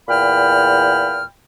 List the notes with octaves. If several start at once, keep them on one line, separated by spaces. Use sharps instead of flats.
E2 A#2 G5 B5 F6